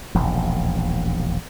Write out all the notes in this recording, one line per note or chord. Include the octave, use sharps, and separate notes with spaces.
E1 A#1 D#2